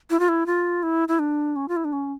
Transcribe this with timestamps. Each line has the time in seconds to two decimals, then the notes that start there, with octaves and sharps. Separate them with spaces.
0.10 E4
0.20 F4
0.29 E4
0.46 F4
0.83 E4
1.08 E4
1.19 D4
1.56 C#4
1.68 F4
1.76 E4
1.85 D4
1.93 C#4